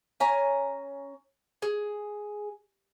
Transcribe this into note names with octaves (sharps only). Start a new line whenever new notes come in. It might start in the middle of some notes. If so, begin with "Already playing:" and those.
C#4 G#5 A#5
G#4